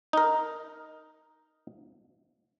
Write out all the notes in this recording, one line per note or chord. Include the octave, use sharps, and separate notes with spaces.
D#4 A#4